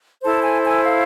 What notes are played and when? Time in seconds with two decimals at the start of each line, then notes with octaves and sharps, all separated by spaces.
0.23 E4 A4 C5 A5
0.42 G#5
0.63 G#5
0.83 F5